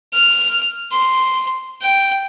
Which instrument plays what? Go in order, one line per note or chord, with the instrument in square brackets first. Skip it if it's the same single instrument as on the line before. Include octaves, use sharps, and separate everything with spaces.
[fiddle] F6
C6
G5